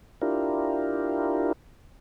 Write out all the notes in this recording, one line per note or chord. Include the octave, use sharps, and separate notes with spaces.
D4 E4 F4 G4 A#4